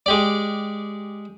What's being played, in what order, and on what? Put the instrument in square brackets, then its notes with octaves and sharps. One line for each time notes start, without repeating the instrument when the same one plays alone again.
[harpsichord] G#3 G4 D5